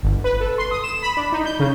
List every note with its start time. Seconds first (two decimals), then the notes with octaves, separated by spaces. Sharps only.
0.03 G1
0.24 B4
0.40 A4
0.58 C6
0.71 D#6
0.84 E7
1.02 B5
1.17 D4
1.32 D#4
1.45 G6
1.60 C#3